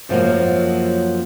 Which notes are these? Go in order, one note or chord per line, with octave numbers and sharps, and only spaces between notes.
F#2 F3 F#3 A#3